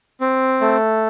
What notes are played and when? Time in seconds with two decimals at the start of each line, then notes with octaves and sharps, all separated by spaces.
0.21 C4
0.61 A3